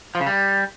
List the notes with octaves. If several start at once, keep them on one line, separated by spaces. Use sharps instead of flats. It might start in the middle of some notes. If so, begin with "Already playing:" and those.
F3
C#3
G3